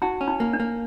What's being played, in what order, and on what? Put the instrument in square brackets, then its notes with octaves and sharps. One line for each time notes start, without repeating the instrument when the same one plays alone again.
[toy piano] D#4 [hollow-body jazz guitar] F#4
[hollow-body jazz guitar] C#4
[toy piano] D#4
[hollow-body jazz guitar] A#3
[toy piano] D4
[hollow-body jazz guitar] A#3